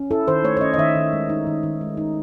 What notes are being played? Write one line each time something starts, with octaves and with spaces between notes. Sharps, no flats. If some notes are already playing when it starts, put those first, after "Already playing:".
Already playing: C#4
E4 A4
D#3 C5
A3 C#5
C#5
C#4 D#5
D#5
D#3 E5
D#3
G#3
D#4
D#3
D#3
G#3
D#4